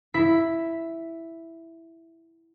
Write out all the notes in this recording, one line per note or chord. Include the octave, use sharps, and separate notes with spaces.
E4 E5 B6